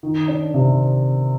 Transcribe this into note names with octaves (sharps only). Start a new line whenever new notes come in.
D#3
D4
C3